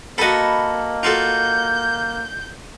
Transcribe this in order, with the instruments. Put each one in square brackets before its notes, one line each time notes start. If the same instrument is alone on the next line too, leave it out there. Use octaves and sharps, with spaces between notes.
[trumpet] A#3 [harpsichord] F#4 A4 [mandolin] D#5 A5 B5
[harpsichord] F4 F#4 A4 [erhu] G6